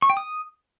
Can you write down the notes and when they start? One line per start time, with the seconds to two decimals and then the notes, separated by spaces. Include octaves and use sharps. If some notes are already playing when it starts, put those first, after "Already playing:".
0.02 C#6
0.10 G5
0.17 D#6